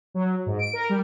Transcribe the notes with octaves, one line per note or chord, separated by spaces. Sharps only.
F#3
G#2
D7
A#4
G3